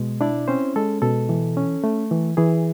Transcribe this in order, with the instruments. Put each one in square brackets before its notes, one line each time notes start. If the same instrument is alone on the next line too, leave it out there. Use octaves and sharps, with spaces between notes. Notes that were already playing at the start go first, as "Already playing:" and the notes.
Already playing: [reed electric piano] B2 G#3
D4 E4 D5
C4 C#4 C5
G#3 A4
B2 A4
E3
C#4
A3
E3
E3 G#4